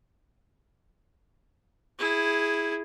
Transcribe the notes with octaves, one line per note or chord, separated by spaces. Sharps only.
E4 G#4